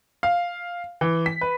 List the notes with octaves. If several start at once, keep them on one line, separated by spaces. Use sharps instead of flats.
F5
E3
B6
B4